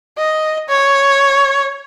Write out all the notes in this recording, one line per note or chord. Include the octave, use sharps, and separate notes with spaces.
D#5
C#5